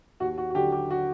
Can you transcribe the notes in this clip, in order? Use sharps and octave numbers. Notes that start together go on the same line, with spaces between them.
D#2 F#4
F#4
F#4
D3 F#3 G4
G4
F#4